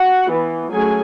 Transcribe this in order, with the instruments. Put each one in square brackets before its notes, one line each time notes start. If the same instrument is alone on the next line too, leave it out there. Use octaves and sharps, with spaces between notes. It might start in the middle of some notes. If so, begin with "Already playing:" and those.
Already playing: [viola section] F#4 F#5
E3 B3
F#3 A3 C#4 G#4 G#5